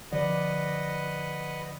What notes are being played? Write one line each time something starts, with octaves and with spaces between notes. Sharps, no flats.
D3 F3 B4 D5 D#5 F#5